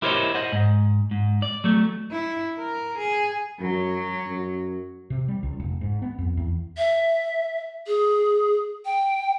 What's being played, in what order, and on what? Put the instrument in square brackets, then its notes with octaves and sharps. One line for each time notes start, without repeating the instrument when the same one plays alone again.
[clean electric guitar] E4 G4 A#4 C5 C#5 D#5
C5 D#5 F#5
G#2
G#2
D5
F#3 A3
[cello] E4
A#4
G#4
[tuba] F#2 [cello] F#3
[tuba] F#2
[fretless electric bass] C3
G3
C#2
F1
G#2
B3
F2
E2
[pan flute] E5
G#4
G5